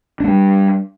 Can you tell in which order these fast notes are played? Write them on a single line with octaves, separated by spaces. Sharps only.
D4 A3 G3